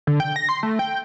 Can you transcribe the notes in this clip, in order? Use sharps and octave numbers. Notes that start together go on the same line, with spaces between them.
D3
G5
A#6
C6
A3
G5